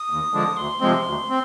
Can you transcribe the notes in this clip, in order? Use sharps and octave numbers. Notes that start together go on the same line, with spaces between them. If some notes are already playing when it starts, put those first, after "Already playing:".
Already playing: D#6
D#2
D3 F3 G#3 D4
D2 C6
C3 F3 G#3 C4
D2
C4